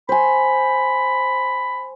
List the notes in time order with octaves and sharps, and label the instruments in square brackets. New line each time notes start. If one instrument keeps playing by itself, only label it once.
[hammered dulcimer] C5 G#5 [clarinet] B5